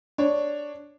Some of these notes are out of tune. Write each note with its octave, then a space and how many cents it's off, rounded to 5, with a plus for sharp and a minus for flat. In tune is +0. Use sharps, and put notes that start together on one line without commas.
D4 +0 C#5 +0